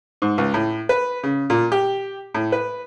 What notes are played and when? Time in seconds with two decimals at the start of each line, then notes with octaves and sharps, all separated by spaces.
0.22 G#2
0.38 C#2
0.54 A2
0.89 B4
1.24 C#3
1.50 A#2
1.72 G4
2.34 A2
2.52 B4